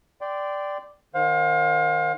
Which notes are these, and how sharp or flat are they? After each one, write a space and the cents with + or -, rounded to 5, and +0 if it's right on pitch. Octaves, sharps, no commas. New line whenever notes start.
D5 +0 G5 -10 C6 -25
D#3 +0 C5 +10 F5 +35